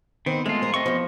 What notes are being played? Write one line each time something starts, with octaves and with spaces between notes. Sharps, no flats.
D#3 B3 C4 C5
G#3 A3 F4
F3 A#4
A3 C4 D#5 C#6
E2 F3